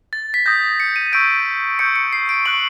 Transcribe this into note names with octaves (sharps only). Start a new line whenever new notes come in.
A6
B6
D#6 G6 A#6
C#7
D#7
C#6 E6 G6 D7
C#6 E6 G6 C#7
C#7
C7
D7
C#6 F#6 F#7